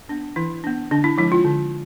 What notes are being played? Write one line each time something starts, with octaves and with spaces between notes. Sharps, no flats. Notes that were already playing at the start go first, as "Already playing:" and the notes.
B3 D4
E3 E4
B3 D4
D3 D4
E4
F3 G#3 E4
F4
D3